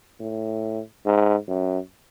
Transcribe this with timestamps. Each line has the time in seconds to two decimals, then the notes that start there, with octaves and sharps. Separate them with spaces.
0.20 A2
1.06 G#2
1.48 F#2